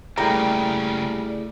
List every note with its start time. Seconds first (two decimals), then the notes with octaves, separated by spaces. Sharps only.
0.18 C#3 G3 A3 A#3 E4 G#4 G5 A#5